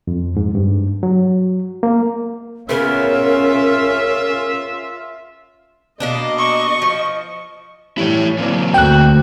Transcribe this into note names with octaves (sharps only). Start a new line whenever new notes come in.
F2
G#2
G2
F#3
A#3
C#3 B3 C#4 F4 A#4 E5
B2 A#3 D4 D#5
C#6
F3
A2 E3 G3 E4 C#5
E3 F#3 A#3 C4 D5
D2 F#4 G5 F#6